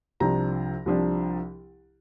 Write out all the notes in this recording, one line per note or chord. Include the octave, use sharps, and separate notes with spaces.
C2 C3 F3 D4 A#5
C2 C3 F3 D4